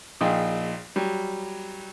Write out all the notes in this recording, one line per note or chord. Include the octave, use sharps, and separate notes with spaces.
A#1 A#2 D#4 G#4 G5
F#3 G3